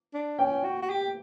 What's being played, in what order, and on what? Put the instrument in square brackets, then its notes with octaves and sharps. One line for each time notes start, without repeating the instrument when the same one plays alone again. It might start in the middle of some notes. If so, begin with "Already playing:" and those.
[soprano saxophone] D4
[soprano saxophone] C#4 [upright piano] G5
[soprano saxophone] F#4
F#4
G4